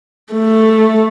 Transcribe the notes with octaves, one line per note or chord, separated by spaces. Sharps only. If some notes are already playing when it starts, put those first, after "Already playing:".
A3